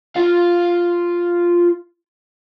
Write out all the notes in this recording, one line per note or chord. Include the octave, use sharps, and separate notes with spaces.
F4 F5